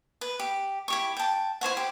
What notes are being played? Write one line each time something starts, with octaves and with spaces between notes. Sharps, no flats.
B4
G4
E4 G4 C#6
G5 A5
E4 C5 C#5 F#5
G4